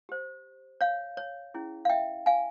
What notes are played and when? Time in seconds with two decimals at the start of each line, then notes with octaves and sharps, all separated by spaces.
0.09 G4 C5
0.81 C#5 F5
1.17 C#5
1.54 C#4 E4 G#4
1.85 F5
1.90 E5 G5
2.26 F5 G#5